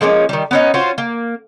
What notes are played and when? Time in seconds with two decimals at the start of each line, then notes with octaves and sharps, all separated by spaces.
0.01 F3 G#3 A#3 C#4
0.29 D#3 G3
0.51 B3 C#4 D#4
0.74 C#4 F4 F#4 C5
0.98 A#3